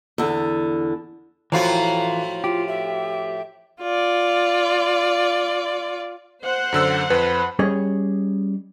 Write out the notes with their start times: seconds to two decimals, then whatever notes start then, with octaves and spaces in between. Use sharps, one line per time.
0.18 E2 D3
1.52 A2 E3 F3 F4 F#4 A#5
2.44 F4 G4
2.68 E5
3.81 F4 D5
6.43 C5 F#5
6.72 F#2 D3 E6
7.10 F2 B4
7.59 G3 C#4 G#4 C#5 D#5